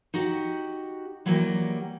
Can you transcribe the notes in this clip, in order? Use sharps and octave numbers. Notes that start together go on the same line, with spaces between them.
D#4 F#4 G4 F#5
E3 F#3 G3 A#3 B3